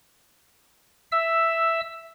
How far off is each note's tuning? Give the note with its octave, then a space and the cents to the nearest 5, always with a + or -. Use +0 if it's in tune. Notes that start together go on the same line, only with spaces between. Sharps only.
E5 +0 E6 +5